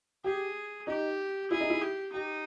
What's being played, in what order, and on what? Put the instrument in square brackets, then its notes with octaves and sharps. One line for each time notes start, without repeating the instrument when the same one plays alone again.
[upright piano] G4 [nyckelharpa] G#4
[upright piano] D#4 [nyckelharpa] G4
[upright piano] E4 [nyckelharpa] G#4
[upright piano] D#4
E4
[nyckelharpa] G4
[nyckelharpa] D#4 [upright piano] G4